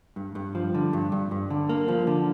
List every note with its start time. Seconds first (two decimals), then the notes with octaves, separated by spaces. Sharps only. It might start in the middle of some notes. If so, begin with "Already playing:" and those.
0.16 G2
0.35 G2
0.55 F3
0.75 D3
0.93 G2
1.12 G2
1.31 G2
1.50 D3
1.69 A#3
1.88 F3
2.07 D3